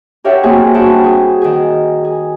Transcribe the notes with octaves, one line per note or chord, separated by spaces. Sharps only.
G4 A#4 C#5 E5 F#5 G5
A#3 C4 F#4 G#4 G#5
G2 F#4 G5 A5
G#4
D#3 G#4
G#4